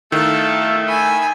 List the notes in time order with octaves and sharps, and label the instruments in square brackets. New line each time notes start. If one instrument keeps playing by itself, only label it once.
[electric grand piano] D#3 [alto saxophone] A3 [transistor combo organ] E4 F5 [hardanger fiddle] A4
[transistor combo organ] E5 B5 [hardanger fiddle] G#5